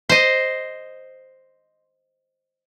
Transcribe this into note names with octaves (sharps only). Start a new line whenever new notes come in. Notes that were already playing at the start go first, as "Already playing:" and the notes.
C5 D#5